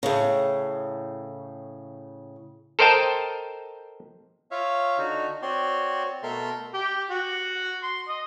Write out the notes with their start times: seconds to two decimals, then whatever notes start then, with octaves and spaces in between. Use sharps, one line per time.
0.03 A2 C#3
2.79 A4 A#4 C5 D#5 G5 A5
4.51 F4 C#5 E5 F5
4.98 D3 D#4 F#4
5.42 C4 F#4 C#5 D5 C6
6.23 B2 A3 A4 A#4 E5 C6
6.74 G4
7.11 F#4
7.83 C6
8.09 D#5